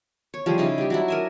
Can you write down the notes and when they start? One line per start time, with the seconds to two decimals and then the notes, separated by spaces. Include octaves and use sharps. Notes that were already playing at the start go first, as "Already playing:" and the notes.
0.34 C#5
0.46 F3 G3 G#4
0.58 C#3 D#4 E4 G#4
0.78 G3 G4
0.90 F#3 D4 E4
1.08 A#4 E5 G#5